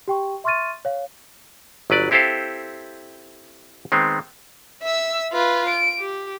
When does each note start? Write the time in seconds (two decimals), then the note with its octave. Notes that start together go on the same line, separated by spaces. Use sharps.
0.08 G4 G5 C#6
0.44 E5 C6 C#6 F6 A6 D#7
0.85 C#5 F5
1.90 G1 F#3 B4 D5
2.11 C4 E4 G4 A4 C5 F5
3.92 D#3 G#3 B3 C4
4.83 E5 E6
5.33 F4 B4
5.69 D7
5.99 G4